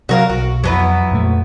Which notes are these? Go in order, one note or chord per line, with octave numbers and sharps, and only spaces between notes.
C3 F#3 F#4 A#4 F5
B1 F#4
F2 F#3 B3 E4
F2 A#2 A3